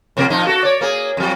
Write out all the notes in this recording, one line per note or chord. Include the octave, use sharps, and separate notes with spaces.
F2 C3 A#3
A#2 F3 D#4
F#4 A4
C#5 D5
A#3 G#4
F2 F#3